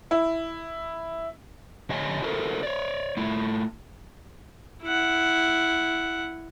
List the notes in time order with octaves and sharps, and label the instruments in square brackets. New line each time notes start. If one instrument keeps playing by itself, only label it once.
[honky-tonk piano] E4
[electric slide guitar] F2 D3 G4 C#5 D#5 G#5
E4 F#4 A4 A#4 C5
C#5 D5
A3 E4 F4
[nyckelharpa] E4 F#5